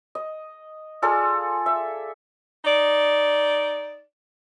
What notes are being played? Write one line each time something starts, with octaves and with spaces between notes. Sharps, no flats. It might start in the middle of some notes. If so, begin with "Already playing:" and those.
D#5
F4 G#4 A4 D5
E5
D#4 D5